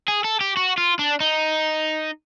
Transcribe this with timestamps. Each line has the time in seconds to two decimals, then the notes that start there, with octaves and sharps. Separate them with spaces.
0.08 G#4
0.24 A4
0.41 G4
0.57 F#4
0.78 F4
0.99 D4
1.21 D#4